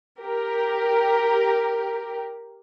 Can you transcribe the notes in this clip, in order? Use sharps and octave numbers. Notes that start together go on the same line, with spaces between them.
G4 A#4